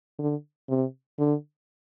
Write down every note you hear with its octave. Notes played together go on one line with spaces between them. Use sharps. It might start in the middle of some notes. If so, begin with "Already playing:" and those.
D3
C3
D3